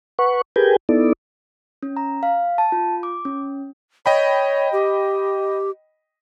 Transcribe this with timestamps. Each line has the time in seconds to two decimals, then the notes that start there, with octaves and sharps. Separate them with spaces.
0.19 B4 F#5 C#6
0.56 G4 G#4 A#4 B4 G5 G#5
0.89 B3 D#4 E4 A4 D5
1.83 C#4
1.97 A#5
2.23 F5
2.58 A5
2.72 F4
3.03 D6
3.25 C#4
4.06 C#5 D#5 G5 B5
4.73 G4